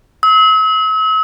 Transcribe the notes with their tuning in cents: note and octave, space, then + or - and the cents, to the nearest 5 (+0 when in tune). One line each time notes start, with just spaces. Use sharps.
E6 -40